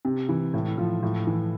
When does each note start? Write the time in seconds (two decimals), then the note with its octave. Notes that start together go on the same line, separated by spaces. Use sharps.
0.05 C3
0.29 E3
0.54 A2
0.78 F3
1.03 A2
1.27 E3